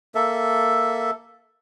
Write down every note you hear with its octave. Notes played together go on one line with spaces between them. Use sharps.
A#3 A4 E5